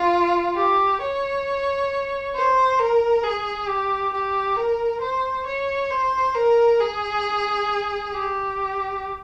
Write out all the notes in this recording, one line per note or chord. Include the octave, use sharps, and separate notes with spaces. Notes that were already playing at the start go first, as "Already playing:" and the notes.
Already playing: F4
G4
C#5
C5
A#4
G#4
G4
G4
A#4
C5
C#5
C5
A#4
G#4
G4